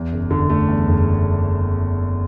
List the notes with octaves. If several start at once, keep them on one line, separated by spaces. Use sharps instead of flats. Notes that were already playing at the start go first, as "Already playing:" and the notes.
Already playing: E2
F#1
D3
A3
E2
F#1